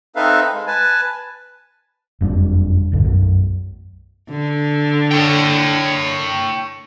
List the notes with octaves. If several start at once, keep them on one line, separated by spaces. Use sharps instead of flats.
C4 D#4 A4 B4 E5 F5
G#3
B4 G#5 A5
F#1 F2 G3 D4
E1 B1 G2 D3
B1 F#2
D3
C#5 G5